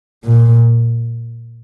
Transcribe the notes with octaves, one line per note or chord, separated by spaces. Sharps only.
A#2